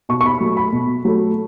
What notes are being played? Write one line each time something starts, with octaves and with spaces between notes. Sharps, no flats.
B2 C#6
C#6
B5
F#3 A3
B5
B2
F#3 A3